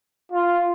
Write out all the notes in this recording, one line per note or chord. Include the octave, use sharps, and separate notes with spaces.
F4